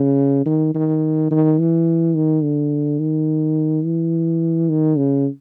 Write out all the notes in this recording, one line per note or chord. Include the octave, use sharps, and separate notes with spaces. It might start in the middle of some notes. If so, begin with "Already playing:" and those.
Already playing: C#3
D#3
D#3
D#3
E3
D#3
D3
D#3
E3
D#3
C#3